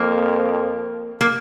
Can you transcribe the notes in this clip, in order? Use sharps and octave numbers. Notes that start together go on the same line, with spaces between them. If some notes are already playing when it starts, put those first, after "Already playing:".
Already playing: F2 A#3
A#3